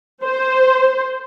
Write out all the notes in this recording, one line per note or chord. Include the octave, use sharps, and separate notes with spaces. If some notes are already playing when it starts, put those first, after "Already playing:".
C5